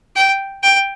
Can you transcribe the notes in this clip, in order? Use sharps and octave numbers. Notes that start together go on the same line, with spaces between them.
G5
G5